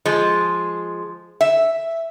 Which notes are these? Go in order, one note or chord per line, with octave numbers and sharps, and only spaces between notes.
F3 G#3
E5